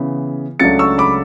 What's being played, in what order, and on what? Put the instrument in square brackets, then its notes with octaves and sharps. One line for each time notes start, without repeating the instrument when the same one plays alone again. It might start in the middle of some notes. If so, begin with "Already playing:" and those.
Already playing: [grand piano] C#3 E3 B3
C#2 C#3 F#3 A3 D4 A6 C#7
C#6 E6
B5 D6